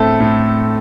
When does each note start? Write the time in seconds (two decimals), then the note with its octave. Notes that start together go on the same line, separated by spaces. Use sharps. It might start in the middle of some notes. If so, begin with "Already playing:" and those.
Already playing: A2 A3 C4 A4
0.20 A2